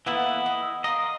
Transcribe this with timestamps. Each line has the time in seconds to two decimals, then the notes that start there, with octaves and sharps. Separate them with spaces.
0.06 E3 A#3 B3 E4 A4
0.46 D#5
0.84 A#4 D#5 F5 C6